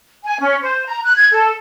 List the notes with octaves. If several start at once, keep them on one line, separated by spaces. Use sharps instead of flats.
G#5
C#4
C5
A#5
F#6
G#6
A4